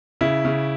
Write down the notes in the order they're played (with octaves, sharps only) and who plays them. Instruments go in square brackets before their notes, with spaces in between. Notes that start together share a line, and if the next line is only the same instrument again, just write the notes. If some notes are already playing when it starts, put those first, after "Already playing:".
[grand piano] C#3 E4
C#3